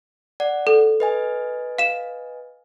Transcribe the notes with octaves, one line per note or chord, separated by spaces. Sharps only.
D5 F#5
A4
B4 D#5 G#5
F5 E7